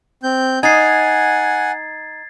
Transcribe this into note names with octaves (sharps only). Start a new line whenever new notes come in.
C4 G6
D#4 F#5 G#5 G#6 A6 C7